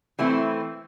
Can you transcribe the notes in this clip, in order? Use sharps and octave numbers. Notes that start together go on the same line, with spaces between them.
E3 A3 C4 E4